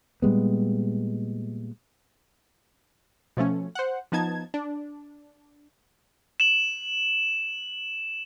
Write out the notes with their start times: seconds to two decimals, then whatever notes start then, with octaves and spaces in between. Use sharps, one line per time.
0.22 A#2 G3 G#3 B3
3.37 B2 F3 A3 C#4
3.75 C5 F#5
4.12 F3 B3 D#4 A5 G#6
4.54 D4
6.40 E7 F#7